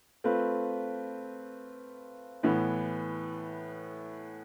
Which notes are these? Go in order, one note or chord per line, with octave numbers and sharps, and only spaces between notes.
A3 C4 F4 B4
A2 E3 B3